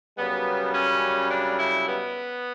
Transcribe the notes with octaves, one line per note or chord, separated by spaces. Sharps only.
F#2 C#3 G3 B3
C#4
D4
E4
B3